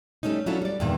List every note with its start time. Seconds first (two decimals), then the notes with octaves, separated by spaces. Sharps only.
0.23 G3 A3 A#3 C#4 D#4
0.46 F#3 C#4 D4 E4 F4 A4
0.62 G3 D5
0.80 E2 G2 A#2 D#3 E3